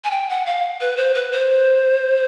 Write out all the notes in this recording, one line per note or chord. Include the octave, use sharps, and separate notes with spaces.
G#5
G5
F#5
F5
B4
C5
B4
C5